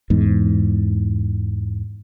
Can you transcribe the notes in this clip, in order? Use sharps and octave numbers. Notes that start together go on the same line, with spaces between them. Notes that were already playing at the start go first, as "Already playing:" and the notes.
E2 G#2